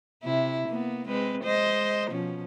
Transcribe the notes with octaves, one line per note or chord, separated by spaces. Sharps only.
C3 E4
A#3 B3
G#3 C4 B4
G#3 C5 D#5
B2 F3 C#4